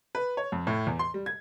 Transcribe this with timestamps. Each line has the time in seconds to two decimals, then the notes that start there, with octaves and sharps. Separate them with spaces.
0.15 B4
0.37 C#5
0.52 F2
0.67 A2
0.87 E2
0.99 C6
1.14 G3
1.26 G#6